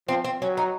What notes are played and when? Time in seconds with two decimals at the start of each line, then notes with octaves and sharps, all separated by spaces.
0.08 F3 C4
0.24 C4
0.41 F#3 C#4
0.57 D#4